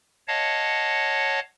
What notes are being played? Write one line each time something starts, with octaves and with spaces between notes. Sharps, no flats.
C#5 D#5 F5 F#5 A5